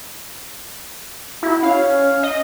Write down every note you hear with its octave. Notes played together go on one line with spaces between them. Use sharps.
E4 F#4
C#4 F5
D#5